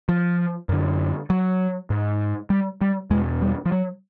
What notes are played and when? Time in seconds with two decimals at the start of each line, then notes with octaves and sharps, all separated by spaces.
0.09 F3
0.69 F#2 D3
1.30 F#3
1.90 G#2
2.50 G3
2.81 G3
3.10 E2 B2 G#3
3.42 G3
3.66 F3
3.72 F#3